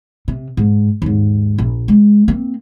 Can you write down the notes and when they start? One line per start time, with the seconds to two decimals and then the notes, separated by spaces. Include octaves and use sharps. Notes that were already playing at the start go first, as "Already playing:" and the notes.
0.28 C3
0.57 G#2
1.02 D#2 G#2
1.58 A#1
1.88 G#3
2.28 A#3 C4